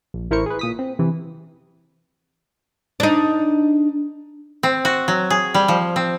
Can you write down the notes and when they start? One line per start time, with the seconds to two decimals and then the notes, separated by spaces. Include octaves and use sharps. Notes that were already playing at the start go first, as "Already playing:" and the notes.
0.14 A#1
0.31 A1 E4 A#4 C5 C#6 C#7
0.46 G#4 B4
0.59 A#2 D#6 B6
0.79 C4
0.99 C3 E3
3.00 D4 D#4
4.63 C4
4.85 F#4
5.08 F#3
5.30 G#4
5.54 G3
5.68 F3
5.96 C4